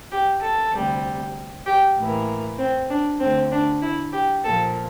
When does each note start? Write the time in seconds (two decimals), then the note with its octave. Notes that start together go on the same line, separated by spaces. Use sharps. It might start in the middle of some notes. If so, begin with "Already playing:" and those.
0.12 G4
0.42 A4
0.73 D2 C3 G3
1.66 G4
1.97 A2 E3 A#3
2.58 C4
2.90 D4
3.20 D2 D3 A3 C4
3.51 D4
3.82 E4
4.13 G4
4.44 A#2 F3 A#3 A4